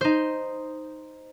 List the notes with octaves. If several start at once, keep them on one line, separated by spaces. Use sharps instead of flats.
D#4 C5